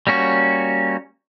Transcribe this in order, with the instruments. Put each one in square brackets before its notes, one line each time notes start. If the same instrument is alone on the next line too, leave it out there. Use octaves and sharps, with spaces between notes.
[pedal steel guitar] G3 A#3 C#4 F#4